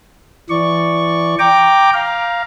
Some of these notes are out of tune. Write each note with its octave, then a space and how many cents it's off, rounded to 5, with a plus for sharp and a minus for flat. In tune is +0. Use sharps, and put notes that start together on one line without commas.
E3 +20 D5 +0 C#6 +0
G5 +0 A#5 +0 D6 +0
F5 +0 A#5 +15